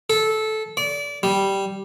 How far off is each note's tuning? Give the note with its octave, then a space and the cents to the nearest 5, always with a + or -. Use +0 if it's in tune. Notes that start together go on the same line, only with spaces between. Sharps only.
A4 -15
D5 -25
G3 -5